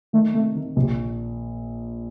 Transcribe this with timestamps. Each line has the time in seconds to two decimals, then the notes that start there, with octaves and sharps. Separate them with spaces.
0.13 D#3 A3
0.34 C3 A3
0.55 D#3
0.76 A#1 C3